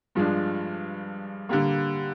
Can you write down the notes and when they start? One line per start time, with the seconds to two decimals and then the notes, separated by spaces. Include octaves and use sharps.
0.15 G2 F3 G#3 D4
1.49 D3 G3 A#3